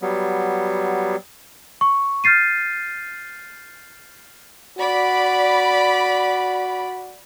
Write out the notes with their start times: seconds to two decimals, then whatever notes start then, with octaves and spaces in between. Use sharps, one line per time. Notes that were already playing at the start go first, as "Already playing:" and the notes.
0.02 F#3 G3 B3
1.81 C#6
2.24 F6 G6 A6 C7 D#7
4.79 F#4 D5 B5